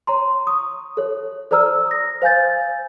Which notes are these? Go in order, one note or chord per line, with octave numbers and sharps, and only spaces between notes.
C#5 A#5 C6
C#6 D#6
A4 C#5
A4 C5 D5 A#5 E6 F6
D#6 A#6
C5 F5 G#5 G6 A6